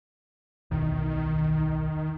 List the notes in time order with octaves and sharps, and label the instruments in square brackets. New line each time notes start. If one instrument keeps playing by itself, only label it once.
[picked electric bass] D1 B1 E2 [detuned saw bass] D#3